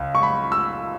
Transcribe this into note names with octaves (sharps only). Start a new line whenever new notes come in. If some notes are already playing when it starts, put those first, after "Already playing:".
Already playing: C#2
C#6
B5
E6